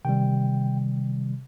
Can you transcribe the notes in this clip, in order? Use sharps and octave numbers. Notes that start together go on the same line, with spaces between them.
C3 D#3 G3 G5